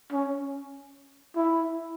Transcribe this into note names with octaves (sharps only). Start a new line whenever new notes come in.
C#4
E4